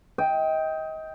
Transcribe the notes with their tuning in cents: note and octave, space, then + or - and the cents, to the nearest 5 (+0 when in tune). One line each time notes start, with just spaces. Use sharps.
D#5 +30 G5 +0